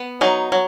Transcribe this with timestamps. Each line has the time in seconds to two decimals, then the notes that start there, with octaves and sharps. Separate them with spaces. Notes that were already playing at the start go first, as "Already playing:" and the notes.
Already playing: B3
0.21 F#3 D#4
0.52 F#3